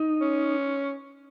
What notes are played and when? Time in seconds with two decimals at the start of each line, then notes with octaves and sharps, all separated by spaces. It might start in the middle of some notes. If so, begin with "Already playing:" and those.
Already playing: D#4
0.21 C#4